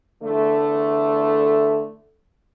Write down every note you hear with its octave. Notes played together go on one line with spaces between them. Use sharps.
E2 D3 A3